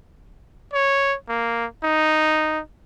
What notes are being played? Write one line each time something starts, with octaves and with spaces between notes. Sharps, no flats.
C#5
A#3
D#4